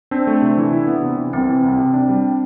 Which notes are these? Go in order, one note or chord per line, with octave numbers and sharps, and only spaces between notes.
C4 D4
A3
C3
E3
E4
B3
C3
E3
C2 C4
E3
C2
C3
D4
G3